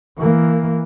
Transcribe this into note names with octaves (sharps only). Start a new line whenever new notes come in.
E3 A#3